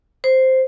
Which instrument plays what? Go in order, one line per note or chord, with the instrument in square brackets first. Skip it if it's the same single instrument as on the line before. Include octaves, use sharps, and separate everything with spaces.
[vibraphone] C5